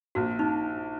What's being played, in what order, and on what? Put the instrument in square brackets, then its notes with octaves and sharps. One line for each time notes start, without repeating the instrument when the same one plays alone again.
[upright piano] A#1 [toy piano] F#4
[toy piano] D#4